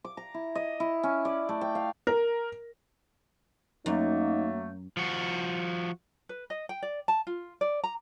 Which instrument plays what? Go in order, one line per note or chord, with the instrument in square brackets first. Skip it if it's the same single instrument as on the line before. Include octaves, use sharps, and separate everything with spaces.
[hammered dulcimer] D6
A#5
E4
D#5
E4
C#4
D5
A3
G5
F5
[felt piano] A#4
[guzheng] F#2 [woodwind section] F#3 A3 A#3 [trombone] D#4
[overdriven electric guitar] F3 F#4
[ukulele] B4
D#5
G5
D5
A5
F4
D5
A#5